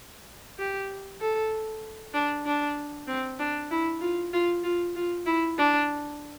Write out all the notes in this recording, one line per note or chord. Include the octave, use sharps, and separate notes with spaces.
G4
A4
D4
D4
C4
D4
E4
F4
F4
F4
F4
E4
D4